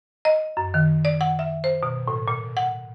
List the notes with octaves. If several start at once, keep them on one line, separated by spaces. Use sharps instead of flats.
D#5
F#2
D#3
D5
F#5
E5
C5
B2
A2
A#2
F#5